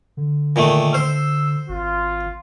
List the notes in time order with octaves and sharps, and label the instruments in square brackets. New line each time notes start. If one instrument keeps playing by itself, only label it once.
[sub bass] D3
[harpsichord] A#2 D#3 A3
[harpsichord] C5 [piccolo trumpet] E6
[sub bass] G#1 [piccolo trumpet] F4